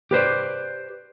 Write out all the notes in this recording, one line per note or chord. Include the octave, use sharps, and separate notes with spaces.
G4 B4 C5 D5